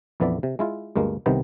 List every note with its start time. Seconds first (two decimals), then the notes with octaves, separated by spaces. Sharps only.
0.20 A#1 F2 E3 B3 D5 E5
0.43 C3
0.59 G#3 E4 F4
0.96 D2 G2 G#3 A#3
1.26 C2 C3 D#3 B3 G5